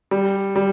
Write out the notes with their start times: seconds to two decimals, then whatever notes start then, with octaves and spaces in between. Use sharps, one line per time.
0.11 G3
0.56 G3